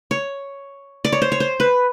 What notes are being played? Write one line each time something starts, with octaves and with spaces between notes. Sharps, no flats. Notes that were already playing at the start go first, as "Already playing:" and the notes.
C#5
D5
C#5
C5
C#5
C5
B4